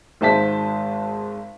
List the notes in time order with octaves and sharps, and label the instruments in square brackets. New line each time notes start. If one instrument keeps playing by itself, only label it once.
[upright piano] G#1 G#2 C5 A5 B6